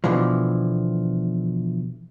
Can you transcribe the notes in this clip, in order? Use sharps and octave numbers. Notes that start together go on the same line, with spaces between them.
B2 D3 E3 F3